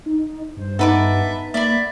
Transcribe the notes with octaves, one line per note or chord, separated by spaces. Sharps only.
D#4
G2 C5
B3 D#4 A4 B4 E5 D6
A#3 D5 E5 B5